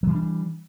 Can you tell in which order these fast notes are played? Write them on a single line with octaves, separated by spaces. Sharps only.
F#3 E3 G3 D4